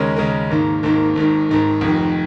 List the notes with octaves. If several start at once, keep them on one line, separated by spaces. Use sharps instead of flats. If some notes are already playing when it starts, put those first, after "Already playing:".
Already playing: D#2 C#3 G#3 C#4 A#4
D#2 C#3 G#3 C#4 A#4
G#1 G#2 D#3 A#3
G#1 G#2 D#3 A#3
G#1 G#2 D#3
G#1 G#2 D#3
F1 F2 D#3